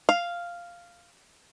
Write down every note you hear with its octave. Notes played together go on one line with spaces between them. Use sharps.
F5